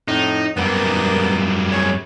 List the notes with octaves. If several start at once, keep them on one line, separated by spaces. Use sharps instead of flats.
F2 A2 D#4
F#2 G3 A#3 B3
G#4 C#5